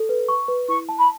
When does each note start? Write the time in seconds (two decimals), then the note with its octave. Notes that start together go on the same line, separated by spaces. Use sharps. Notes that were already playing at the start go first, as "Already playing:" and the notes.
Already playing: A4
0.09 B4
0.29 C#6
0.48 B4
0.68 E4 C#6
0.89 A5
0.99 B5